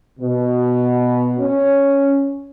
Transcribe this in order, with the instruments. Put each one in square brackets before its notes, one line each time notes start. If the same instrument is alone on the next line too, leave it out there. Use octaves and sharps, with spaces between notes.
[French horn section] B2
C#4